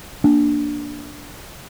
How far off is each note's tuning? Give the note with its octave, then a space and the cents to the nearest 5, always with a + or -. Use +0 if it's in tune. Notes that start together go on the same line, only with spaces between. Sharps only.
A#3 +0 D4 +0